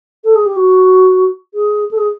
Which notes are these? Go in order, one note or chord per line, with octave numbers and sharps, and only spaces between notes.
A4
G#4
G4
F#4
G#4
A4
G#4